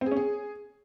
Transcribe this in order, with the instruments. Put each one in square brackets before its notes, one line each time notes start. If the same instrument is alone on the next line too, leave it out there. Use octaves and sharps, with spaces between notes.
[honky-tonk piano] C4
G#4
C#4
G#4